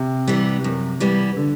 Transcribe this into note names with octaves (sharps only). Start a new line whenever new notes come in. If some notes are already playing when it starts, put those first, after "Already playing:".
Already playing: C3
E3 G3 B3
F#2
E3 G3 B3
D3